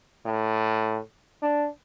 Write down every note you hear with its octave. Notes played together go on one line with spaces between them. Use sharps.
A2
D4